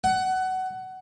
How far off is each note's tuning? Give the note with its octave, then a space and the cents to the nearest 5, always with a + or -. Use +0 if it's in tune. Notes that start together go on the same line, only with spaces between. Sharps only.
F#5 +20